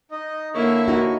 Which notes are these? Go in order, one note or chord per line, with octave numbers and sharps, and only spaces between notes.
D#4 D#5
D3 A#3 E4 C#5 E5 C#6
D#4 F#4